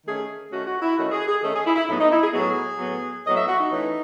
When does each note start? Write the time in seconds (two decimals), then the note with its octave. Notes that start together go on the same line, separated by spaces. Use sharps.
0.05 D#3 A3 C#4 G#4
0.50 D#3 A3 C#4 F#4
0.66 F#4
0.81 E4
0.96 D#3 A3 C#4 F#4
1.11 G#4
1.27 G#4
1.41 D#3 A3 C#4 A4
1.53 G#4
1.65 E4
1.76 E4
1.88 A2 F#3 B3 D#4
1.99 D#4
2.11 E4
2.22 G#4
2.33 A2 F#3 B3 G#4
2.79 A2 F#3 B3
3.25 A2 F#3 B3 D#5
3.36 E5
3.47 F#4
3.59 D#4
3.70 E3 A3 C#4